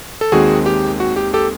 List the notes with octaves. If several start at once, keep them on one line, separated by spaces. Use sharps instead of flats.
A4
D#2 D#3 G#3 C4 F#4 G#4
G4
F#4
G4
G4 A4